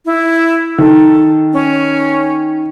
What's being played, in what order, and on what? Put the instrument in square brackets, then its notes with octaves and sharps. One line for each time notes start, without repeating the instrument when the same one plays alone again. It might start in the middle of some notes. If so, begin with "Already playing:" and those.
[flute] E4
[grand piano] D#3 [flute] A4
[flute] C#4